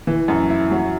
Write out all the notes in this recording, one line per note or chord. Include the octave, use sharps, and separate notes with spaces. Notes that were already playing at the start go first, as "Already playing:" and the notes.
E3
F#2
E4
F#3